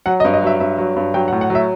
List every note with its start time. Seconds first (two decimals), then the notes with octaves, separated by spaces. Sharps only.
0.06 F#3 F#5
0.20 D#5
0.25 G2
0.33 D#5
0.42 F#3 E5
0.60 G2 E5
0.78 F#3
0.96 G2
1.14 F#3 G5
1.28 F#5
1.32 A2
1.41 F#5
1.50 F#3 E5